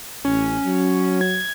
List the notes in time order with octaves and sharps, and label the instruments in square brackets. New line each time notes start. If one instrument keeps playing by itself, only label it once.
[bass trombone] A1 [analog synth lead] C#4
[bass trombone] F#3
[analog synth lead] G#6